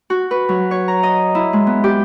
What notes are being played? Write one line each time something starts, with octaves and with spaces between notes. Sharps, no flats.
F#4
B4
F#3
C#5
A#5
D#5
E4
G#3
B3
G4